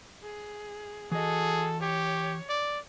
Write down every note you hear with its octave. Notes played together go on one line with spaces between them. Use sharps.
G#4
E3 F#4 G#4 A4 D#5
G4 C#5
D5